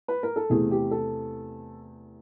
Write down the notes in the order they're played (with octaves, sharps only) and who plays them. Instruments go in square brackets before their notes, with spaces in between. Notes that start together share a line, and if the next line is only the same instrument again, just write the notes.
[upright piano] B4
A#4
A4
E2 C3 E3 A3 G#4
G4
A4